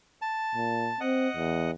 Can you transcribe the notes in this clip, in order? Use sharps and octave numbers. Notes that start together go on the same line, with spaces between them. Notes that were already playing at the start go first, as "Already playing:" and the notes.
A5
A#2
C4 D#5 F#5
E2